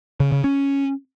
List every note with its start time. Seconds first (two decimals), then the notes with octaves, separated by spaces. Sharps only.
0.20 C#3
0.32 C#3
0.44 C#4